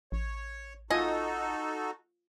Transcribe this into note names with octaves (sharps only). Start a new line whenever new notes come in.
A1 C#5
D#4 F4 F#4 A4 D#5 G#5